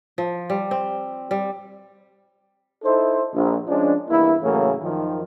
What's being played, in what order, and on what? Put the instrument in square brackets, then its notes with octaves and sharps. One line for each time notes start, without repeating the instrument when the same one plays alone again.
[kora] F3
G3
C4
G3
[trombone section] D#4 E4 A4 C5
A#1
F3 G#3 C#4 D4
E2 G2 A#3 E4
A2 C#3 E3 F#3 A3 A#3
F#2 D#3 F3